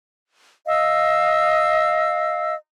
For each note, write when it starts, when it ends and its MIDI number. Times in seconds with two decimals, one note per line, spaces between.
0.67 2.54 75
0.67 2.54 77
0.67 2.54 88